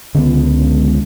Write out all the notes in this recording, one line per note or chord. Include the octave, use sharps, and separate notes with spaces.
C#2 D3 B3